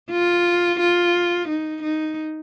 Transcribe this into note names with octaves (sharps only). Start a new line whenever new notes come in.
F4
F4
D#4
D#4